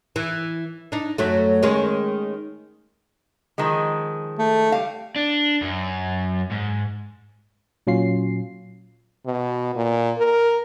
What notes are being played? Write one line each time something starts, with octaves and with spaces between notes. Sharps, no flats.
E3
D4 D#4
F#2 F#3 A3
D#3 G#3 C#4
D#3 F3 G#3
A3
G3 F5
D4
F#2
G#2
A#2 F#3 C#4 F4 C7
B2
A#2
A#4